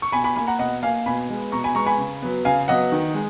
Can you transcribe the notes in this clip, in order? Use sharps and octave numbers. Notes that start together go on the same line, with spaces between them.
C#6
B2 G#5 B5
G#5 B5
A#3 G#5 B5
F#5 A#5
B2 D#5 F#5
A#3 F5 G#5
B2 G#5 B5
G#3 B3
B2 A#5 C#6
G#5 B5
G#3 B3 A#5 C#6
G#5 B5
C#3
F#3 B3
C#3 F5 G#5
F#3 B3 D#5 F#5
D#3
G#3